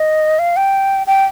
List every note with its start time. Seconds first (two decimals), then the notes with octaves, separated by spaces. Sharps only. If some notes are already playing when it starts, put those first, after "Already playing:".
Already playing: D#5
0.39 F5
0.57 G5
1.07 G5